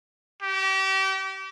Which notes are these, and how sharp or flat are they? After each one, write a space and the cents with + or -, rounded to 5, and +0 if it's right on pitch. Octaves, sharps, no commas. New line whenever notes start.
G4 -35